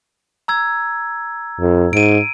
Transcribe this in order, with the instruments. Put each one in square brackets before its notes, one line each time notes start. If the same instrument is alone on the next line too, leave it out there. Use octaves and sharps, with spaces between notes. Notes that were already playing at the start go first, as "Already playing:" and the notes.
[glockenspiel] A#5 E6 G#6
[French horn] F2
[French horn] G#2 [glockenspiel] D7 D#7